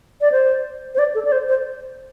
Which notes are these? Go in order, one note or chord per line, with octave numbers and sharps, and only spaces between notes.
D5
C5
C5
D5
A4
D5
C5
C5